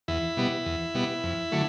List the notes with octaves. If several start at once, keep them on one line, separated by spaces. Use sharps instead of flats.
E2 E4
B2 G3 B3
E2
B2 G3 B3
F2
D3 F#3 A3